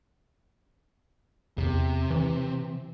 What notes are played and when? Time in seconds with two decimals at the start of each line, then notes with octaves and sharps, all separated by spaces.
1.58 E2 C3
2.10 E3